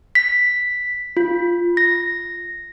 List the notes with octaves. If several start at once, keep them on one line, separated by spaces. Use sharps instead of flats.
B6
F4
A#6